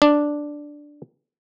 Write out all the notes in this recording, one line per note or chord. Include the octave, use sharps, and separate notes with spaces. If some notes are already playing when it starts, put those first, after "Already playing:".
D4